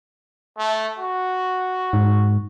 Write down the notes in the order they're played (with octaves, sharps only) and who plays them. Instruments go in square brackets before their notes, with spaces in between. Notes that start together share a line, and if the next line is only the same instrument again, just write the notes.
[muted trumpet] A3
F#4
[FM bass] G#2